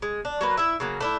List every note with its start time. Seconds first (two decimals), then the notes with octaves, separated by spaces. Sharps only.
0.02 G#3
0.25 D4
0.41 F#3 A#3 B4
0.57 E4 E5
0.80 C#3 F#3 A#3
1.01 A3 D4 E4